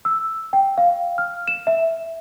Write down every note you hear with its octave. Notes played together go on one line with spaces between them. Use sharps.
E6
G5
F5
F6
E7
E5